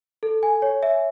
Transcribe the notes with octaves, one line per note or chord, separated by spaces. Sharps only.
A4
G#5
C#5
E5